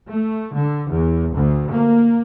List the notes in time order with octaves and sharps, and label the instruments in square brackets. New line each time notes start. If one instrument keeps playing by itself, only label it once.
[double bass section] A3
D3
E2
D2
A#3